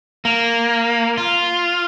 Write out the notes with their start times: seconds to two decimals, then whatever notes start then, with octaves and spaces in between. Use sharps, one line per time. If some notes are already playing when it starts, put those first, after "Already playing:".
0.25 A#3
1.18 F4